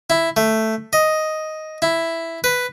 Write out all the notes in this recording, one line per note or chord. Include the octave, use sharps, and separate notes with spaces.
E4
A3
D#5
E4
B4